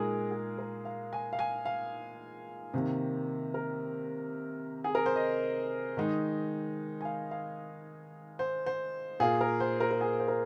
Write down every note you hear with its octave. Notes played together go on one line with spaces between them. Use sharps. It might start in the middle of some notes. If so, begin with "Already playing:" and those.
Already playing: A#2 G#3 D#4 G#4 A#4
G#4
A#4
F5
G#5
F5
G#5
F5
C3 D#3 A#3
A#4
G#4
A#4
C5
D#5
D#3 G#3 D#4
G#5
F5
F5
C5
C5
A#2 A#3 F4 G#4
A#4
C5
A#4
A#4
G#4
C5
A#4